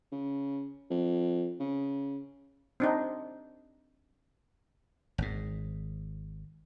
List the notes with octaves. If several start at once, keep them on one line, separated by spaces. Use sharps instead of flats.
C#3
F2
C#3
C4 D4 D#4
G#1 G#2